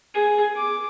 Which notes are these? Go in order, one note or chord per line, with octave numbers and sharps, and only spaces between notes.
G#4
D6